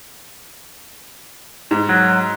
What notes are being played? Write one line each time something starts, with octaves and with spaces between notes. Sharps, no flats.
G#2
F#3